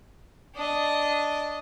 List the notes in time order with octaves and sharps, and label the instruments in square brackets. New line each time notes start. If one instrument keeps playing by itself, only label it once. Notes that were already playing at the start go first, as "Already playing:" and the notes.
[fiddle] D4 D#5